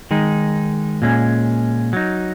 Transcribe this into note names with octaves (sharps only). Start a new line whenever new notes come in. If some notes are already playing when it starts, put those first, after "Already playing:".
D#3 G#3 D#4
A#2 G#3 C#4
F#3 D#4